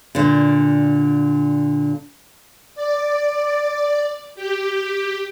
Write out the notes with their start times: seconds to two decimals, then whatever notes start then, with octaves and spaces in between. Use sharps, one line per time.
0.15 A#2 D3
2.75 D5
4.35 G4